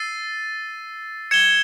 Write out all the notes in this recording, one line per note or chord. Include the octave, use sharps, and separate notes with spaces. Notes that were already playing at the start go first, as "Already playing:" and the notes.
Already playing: E6 A6 C7 D#7
G#6 C#7 E7 G7